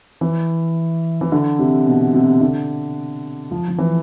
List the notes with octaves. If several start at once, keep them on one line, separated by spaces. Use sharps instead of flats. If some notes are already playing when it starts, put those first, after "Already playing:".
E3
E3
D3
C3
B2
C3
D3
F3
F3
E3